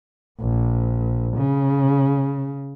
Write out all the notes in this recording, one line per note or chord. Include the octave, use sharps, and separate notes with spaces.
A#1
C#3